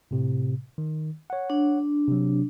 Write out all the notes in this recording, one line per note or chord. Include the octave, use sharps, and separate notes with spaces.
A2 C3
D#3
C#5 F#5
D4
C3 F#3